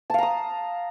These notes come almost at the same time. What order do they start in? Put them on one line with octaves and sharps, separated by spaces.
A5 F5 A#5 D#6